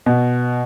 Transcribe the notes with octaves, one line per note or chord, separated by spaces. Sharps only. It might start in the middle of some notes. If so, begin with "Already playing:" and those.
B2